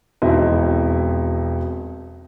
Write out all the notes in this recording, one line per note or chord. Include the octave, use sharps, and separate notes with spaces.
E1 F2 D#4 E4 C5 D#5